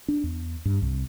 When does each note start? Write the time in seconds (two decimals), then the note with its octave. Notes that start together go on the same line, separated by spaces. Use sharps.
0.08 D4
0.24 E2
0.65 G2
0.82 C2